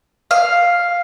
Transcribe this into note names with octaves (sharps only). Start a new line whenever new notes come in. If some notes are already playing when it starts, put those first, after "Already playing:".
F5